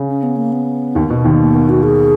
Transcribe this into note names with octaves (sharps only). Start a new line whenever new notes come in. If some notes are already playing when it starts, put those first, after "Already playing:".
Already playing: C#3
C#4
B3
A#3
B3
D#2 D#3
B2
D#2 D#3
A#3
B3
F#4
G#4